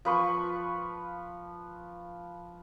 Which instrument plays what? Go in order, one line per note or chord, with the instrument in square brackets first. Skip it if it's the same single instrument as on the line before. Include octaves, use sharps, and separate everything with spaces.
[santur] F3 B4 C#6